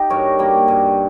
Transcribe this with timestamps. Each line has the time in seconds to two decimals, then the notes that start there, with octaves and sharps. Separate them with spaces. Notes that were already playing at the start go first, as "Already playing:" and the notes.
Already playing: D#4 G4
0.10 G2 A#4 C#5
0.39 G3 A#3
0.68 G2